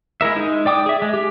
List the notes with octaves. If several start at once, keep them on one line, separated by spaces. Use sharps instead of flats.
G#3 E4 A#4 E5
G#3 D#4
D5 G5 D6 D#6
G#4 E5
G#3
G4